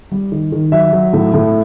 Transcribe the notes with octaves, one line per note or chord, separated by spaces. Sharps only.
G3
D#3
D#3
F#3 E5
F#3
A2
A2